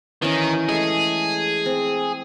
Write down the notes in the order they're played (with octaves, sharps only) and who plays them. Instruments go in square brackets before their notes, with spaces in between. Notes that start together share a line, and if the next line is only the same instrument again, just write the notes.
[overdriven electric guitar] D#3 [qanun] E3 C#4
[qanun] G#3 A3 [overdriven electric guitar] G#4
[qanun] C4